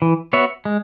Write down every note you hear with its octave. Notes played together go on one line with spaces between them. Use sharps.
E3
B3 F#4 C#5 E5
G#3